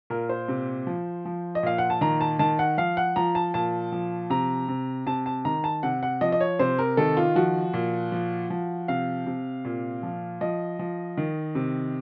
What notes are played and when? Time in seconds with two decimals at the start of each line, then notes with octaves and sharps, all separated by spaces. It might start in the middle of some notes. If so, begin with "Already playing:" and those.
0.10 A#2 A#4
0.29 C5
0.48 C3
0.87 F3
1.25 F3
1.55 D#5
1.63 A#2 F5
1.78 F#5
1.90 A5
2.01 D#3 A#5
2.21 A5
2.39 D#3 A5
2.59 F#5
2.78 F3 F5
2.97 F#5
3.16 F3 A#5
3.35 A5
3.54 A#2 A5
3.92 F3
4.30 C3 A#5
4.68 C3
5.06 C3 A5
5.26 A5
5.45 D#3 A#5
5.64 A5
5.83 C3 F#5
6.03 F#5
6.21 F3 D#5
6.32 D#5
6.40 C#5
6.59 C3 C5
6.79 A#4
6.97 D#3 A4
7.17 F4
7.36 F3 F#4
7.74 A#2
8.12 F3
8.50 F3
8.88 C3 F5
9.27 C3
9.65 A#2
10.03 F3
10.41 F3 D#5
10.79 F3
11.17 D#3
11.55 C3